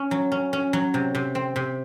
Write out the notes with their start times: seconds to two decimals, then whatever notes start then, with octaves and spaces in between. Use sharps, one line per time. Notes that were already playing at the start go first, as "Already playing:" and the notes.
Already playing: C#4
0.11 F#3
0.32 C#4
0.53 C#4
0.73 F#3
0.94 C3
1.15 C3
1.35 C4
1.56 C3